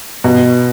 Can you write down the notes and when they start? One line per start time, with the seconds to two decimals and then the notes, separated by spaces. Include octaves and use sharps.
0.24 B2